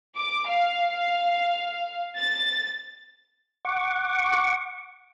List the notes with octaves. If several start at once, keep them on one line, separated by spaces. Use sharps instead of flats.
D6
F5
A6
F#5 C#6 D6